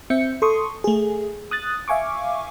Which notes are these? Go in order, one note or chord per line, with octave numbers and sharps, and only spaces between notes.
C4 E5 G6 C#7
A4 C6 C#6 D#6
A3 G#4
D#6 F#6 A6
E5 F5 G#5 C#6 D6